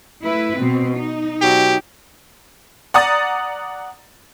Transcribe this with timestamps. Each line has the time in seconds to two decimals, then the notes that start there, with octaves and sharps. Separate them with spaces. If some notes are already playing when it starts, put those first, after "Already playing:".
0.23 A3 E4 B4
0.56 B2 C4
0.97 D#4
1.41 B2 F#3 G4
2.94 D5 F#5 A#5 D#6 A6